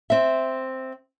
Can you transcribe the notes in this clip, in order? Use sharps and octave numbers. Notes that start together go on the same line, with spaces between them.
C4 E5